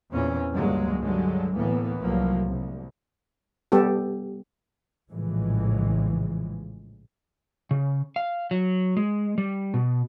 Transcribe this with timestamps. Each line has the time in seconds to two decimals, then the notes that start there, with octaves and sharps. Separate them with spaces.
0.11 E2 A#2 E3 C4 C#4
0.51 C#2 G2 D3 F#3 G#3 A#3
0.99 G2 D3 F#3 G#3
1.54 D2 A2 E3 A#3 B3
2.00 C2 A2 F3 F#3 A#3
2.47 C2
3.72 G3 B3 G4 A4
5.11 A#1 A2 C#3 E3 F3 G#3
7.71 C#3
8.16 F5
8.51 F#3
8.97 G#3
9.38 G3
9.74 B2